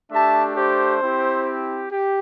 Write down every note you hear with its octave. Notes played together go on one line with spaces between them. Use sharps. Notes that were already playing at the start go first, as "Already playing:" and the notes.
A3 D4 G4 E5 A5
G4 C5
C4 E4 G4
G4